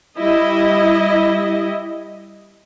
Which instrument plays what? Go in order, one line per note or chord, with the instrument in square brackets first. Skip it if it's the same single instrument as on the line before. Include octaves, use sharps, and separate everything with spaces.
[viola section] G3 E4 D#5